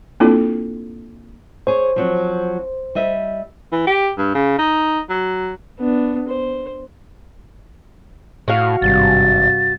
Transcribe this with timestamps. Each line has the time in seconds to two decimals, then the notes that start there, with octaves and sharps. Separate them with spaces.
0.20 A#3 C4 D4 E4 F4 A4
1.67 G#4 C5 C#5
1.96 F3 F#3 C4
2.95 G3 D#5 E5
3.72 E3
3.87 G4
4.18 G2
4.35 C#3
4.59 D#4
5.09 F#3
5.79 B3 D4
6.28 C5
8.48 A2 F#4 F5
8.82 G#1 G2 C3 A6